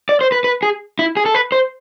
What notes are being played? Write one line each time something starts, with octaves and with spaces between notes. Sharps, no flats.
D5
C5
B4
B4
G#4
E4
G#4
A4
B4
C5